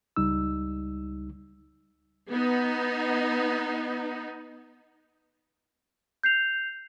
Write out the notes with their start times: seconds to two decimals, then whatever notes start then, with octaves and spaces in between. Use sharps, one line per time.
0.16 C#2 G3 D#4 E6
2.31 B3 D#4
6.23 G6 C7 F7